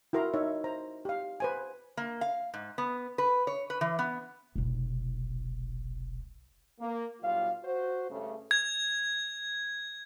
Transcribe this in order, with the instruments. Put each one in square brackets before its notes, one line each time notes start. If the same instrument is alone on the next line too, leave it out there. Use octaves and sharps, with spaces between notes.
[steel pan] E4 F#4 A#4 A#5 C6
D#4 C#5 E5
C5 A#5
G4 F5
B4 C5 G#5
[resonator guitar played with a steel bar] A#3
F5
G#2
B3
B4
C#5
B4
E3
B3
[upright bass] F1 B1
[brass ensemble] A#3
B1 G3 F4 F5
F#4 C5
G2 C#3 A3
[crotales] G#6